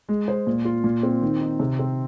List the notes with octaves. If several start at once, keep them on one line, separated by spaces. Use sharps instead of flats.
G#3
C5
A#2
F4
A#2
C4
D#3
D#4
C3
C4